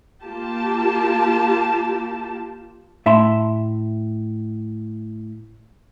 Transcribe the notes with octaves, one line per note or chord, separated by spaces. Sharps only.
A#3 F4 G4 A5
A2 E5 A5 B5 C6